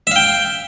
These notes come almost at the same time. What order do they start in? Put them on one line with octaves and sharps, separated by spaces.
E5 F5 G5